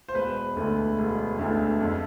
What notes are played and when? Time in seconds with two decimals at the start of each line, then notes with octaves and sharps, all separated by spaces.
0.08 C5
0.15 E1 B4
0.57 D2 D3 A3
0.98 E1
1.39 D2 D3 A3
1.81 F2